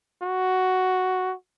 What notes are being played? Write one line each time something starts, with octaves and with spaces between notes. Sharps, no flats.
F#4